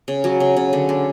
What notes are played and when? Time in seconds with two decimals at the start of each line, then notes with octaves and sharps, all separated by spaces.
0.08 C#3
0.24 F#3
0.40 C#3
0.57 C#3
0.73 D3
0.89 D3